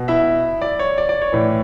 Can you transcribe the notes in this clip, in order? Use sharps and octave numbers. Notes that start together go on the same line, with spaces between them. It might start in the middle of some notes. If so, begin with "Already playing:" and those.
Already playing: B2
E4 E5
D5
C#5
D5
D5
C#5
A2 E3